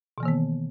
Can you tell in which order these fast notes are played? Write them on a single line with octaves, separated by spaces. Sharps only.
B2 E3 A#3 D#3 B3